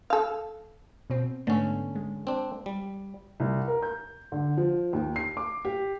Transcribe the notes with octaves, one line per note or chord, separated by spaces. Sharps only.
A4 F5
B2 C4
G#2 D3 A3 B3 C#4
G#3
C4 D4
G3
C2
A#4
G6
D3
F3
D#2
C7
D6
G4